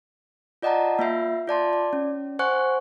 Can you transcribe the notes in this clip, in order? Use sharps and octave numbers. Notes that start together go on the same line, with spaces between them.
F4 D5 D#5 F#5 A5 A#5
A#3 F4 E5 C7
F4 D5 A5 C6
D5
C#4
C5 F#5 G#5 C#6 F#6